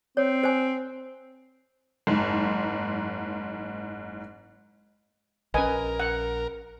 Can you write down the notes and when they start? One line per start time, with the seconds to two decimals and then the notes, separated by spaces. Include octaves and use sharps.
0.17 C4 C#5
0.43 C5 G#5
2.07 F#1 G#2
5.54 A#1 C#4 A#4 B4 D#5 G#5
6.00 F#5